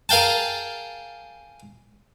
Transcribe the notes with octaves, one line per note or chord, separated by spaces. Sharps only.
G#4 A#4 F5 G5 A5